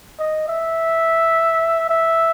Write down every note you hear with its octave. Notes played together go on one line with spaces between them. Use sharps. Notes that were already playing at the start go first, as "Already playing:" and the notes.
D#5
E5
E5